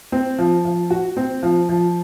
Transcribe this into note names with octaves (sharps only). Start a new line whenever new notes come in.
C4
F3
F3
F#4
C4
F3
F3